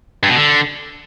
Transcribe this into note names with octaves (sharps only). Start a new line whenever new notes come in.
G2
B2
D3